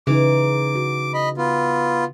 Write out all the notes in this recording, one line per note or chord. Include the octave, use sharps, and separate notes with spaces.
C#3 E3 D#4 D6
F#4
D#5 B5
B3 F4